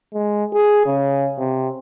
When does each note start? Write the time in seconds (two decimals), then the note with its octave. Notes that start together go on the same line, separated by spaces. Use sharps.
0.14 G#3
0.53 G#4
0.86 C#3
1.38 C3